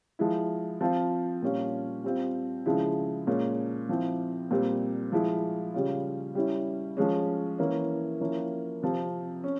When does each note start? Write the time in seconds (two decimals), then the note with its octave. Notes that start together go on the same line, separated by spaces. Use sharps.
0.19 F3 G#3 E4
0.81 F3 C4 F4
1.42 A#2 G3 C#4 F4
2.04 G3 C4 F4
2.66 C#3 F3 G#3 E4
3.27 A#2 G#3 C#4
3.89 F3 C4 E4
4.51 A#2 G3 C4
5.12 F3 G#3 E4
5.74 C#3 G3 C#4 F4
6.35 G3 C#4 E4
6.97 F3 G#3 C#4
7.58 E3 A#3 C#4
8.20 F3 A#3 C#4 E4
8.83 C3 F3 C4
9.44 C#4